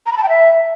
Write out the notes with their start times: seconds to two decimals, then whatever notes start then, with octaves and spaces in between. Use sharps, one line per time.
0.06 A#5
0.12 B5
0.18 A5
0.23 G5
0.29 E5